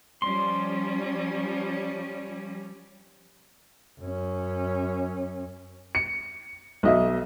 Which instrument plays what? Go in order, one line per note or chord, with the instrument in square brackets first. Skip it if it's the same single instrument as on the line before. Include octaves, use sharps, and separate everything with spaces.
[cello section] F3 G3 C#4 [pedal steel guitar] C6
[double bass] F#2 C#4
[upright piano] C#7
B1 D#5 E5